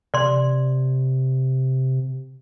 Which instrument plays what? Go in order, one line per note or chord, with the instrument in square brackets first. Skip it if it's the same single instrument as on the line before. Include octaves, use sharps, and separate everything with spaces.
[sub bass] C3 [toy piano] D5 C6